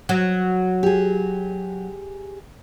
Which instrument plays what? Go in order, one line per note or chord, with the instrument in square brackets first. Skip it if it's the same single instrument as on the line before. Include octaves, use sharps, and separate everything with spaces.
[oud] F#3
[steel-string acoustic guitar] G4 G#4